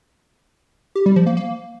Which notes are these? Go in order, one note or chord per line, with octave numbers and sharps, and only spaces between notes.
G4
G3
F3
A#3
A#3